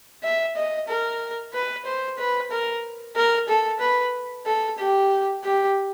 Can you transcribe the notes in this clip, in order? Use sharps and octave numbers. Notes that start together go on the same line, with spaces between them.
E5
D#5
A#4
B4
C5
B4
A#4
A#4
A4
B4
A4
G4
G4